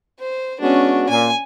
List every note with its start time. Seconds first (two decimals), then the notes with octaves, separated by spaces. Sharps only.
0.19 C5
0.61 G#3 B3 C#4 D4 F#4
1.09 A#2 G#5